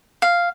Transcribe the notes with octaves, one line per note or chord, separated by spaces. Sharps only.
F5